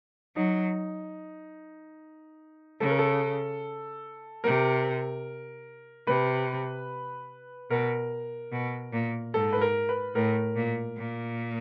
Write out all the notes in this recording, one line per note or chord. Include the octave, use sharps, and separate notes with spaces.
F#3 D#4
C#3 A4
A#4
A4
C3 A#4
C3 B4
B2 A#4
B2
A#2
G#2 A4
B4
A#4
B4
A2 A#4
A#2
A#2